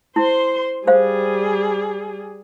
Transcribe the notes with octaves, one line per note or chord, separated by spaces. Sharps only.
E4 C5 C6
G3 G#4 C5 F5